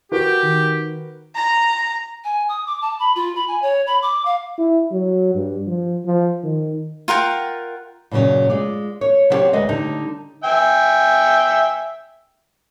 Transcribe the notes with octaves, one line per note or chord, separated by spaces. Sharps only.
F#4 G4 A#4 B4
D#3
A#5
G#5
D#6
D6
A5
B5
F4
B5
G#5
C#5
B5
D6
F5
E4
F#3
G2
F3
F3
D#3
F4 A#4 F#5 G5
G2 A#2 C#3 E3 F#3
G#3 F4 D5
C#5
F#3 B3 C4 G4 C#5 D5
D2 G#3 B4 D5 D#5
D3 G3 D#4
E5 G5 G#5